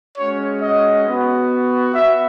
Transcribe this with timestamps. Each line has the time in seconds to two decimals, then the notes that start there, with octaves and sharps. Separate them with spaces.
0.18 G#3 C#4 F#4 C#5
0.62 D#5
1.06 B3 F#4
1.94 B3 F#4 E5